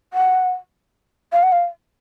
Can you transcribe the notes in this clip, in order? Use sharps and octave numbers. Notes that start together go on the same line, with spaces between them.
F#5
F5
F#5
F5